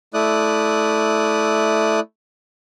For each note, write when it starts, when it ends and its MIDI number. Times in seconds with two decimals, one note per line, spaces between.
0.14 2.00 57
0.14 2.00 64
0.14 2.00 74
0.14 2.00 87
0.14 2.00 90